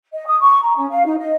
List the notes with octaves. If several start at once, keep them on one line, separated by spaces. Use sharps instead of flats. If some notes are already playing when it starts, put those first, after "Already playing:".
D#5
D#6
C#6
A#5
C#4
F5
D#4
D#5